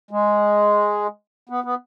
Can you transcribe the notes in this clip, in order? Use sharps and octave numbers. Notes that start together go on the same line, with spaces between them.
G#3
B3
B3